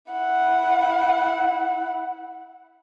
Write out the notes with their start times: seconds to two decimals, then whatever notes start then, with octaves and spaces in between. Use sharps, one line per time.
0.12 E4 F#5